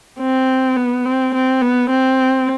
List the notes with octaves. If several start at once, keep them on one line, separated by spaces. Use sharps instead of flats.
C4
B3
C4
C4
B3
C4